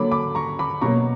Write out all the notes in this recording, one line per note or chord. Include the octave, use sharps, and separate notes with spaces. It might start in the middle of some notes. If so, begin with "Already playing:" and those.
Already playing: D3 F#3 A#3 B5 D6
B5 D6
A#5 C#6
B5 D6
B2 F#3 A#3 A#5 C#6